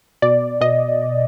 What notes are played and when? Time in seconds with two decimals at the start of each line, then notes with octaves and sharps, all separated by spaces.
0.22 B2 D5
0.61 B2 D#5